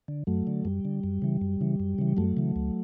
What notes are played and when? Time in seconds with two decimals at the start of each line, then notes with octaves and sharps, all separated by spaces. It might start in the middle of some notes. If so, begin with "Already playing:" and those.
0.08 D3
0.27 F#2 F#3 A3
0.47 D3
0.65 F#2 G3
0.85 D3
1.04 F#2
1.22 C#3 E3
1.41 F#2
1.61 C#3 E3
1.80 F#2
1.98 C#3 E3
2.17 F#2 F#3 A3
2.37 C#3 E3
2.56 D2